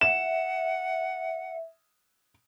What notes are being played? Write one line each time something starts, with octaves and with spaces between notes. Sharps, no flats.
E5 F#5 E7